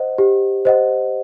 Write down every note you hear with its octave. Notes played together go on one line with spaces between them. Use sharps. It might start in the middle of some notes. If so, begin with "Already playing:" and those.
Already playing: C5 D#5 F#5
G4
C5 D#5 F#5